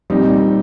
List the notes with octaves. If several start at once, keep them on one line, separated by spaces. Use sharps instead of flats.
A#2 G3 C4 D#4